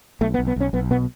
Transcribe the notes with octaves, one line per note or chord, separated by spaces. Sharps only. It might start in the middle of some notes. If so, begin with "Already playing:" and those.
B1 A3
B3
B1
B3
B1 C#4
B1 B3
B2 B3